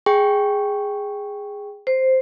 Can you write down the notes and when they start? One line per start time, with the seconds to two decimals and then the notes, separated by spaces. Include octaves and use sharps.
0.06 G#4 G5 C#6
1.87 C5